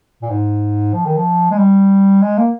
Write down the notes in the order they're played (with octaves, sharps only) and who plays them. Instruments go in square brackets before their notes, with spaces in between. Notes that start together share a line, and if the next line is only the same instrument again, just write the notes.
[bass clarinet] A#2
G#2
F3
D#3
F3
G#3
G3
G#3
A#3